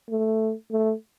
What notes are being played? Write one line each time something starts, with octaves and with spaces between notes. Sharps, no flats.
A3
A3